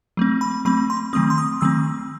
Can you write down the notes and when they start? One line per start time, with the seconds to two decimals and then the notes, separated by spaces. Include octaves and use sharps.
0.17 F#3 A3 C4
0.41 B5
0.65 F#3 A3 C4 B5
0.90 C6
1.13 D#3 F#3 A3 C4 D#6
1.30 C6
1.38 D#6
1.61 D#3 F#3 A3 C4 E6